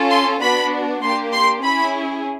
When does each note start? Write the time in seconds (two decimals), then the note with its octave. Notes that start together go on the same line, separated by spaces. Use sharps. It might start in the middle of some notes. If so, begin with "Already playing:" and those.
Already playing: C#4 F4 A4
0.09 C6
0.41 B3 D4 F#4 B5
1.02 A#3 D4 G4 C6
1.33 C6
1.63 C#4 E4 G#4 B5